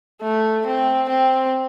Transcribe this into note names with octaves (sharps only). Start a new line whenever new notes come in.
A3
C4
C4